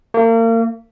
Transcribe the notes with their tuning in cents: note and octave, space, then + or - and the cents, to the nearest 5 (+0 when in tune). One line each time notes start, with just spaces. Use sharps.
A#3 -35